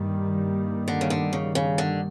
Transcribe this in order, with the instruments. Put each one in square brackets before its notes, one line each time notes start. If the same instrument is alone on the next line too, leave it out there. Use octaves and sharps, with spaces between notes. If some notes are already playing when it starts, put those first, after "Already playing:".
Already playing: [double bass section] G2 D#3 G3 A#3
[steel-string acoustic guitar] D3
C#3
D3
C#3
C#3
D3